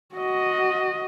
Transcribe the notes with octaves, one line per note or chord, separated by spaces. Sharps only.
F#4 D#5